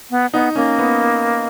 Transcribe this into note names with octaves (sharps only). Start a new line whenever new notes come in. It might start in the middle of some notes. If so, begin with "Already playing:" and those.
B3
B3 D#4
A#3 C#4
B3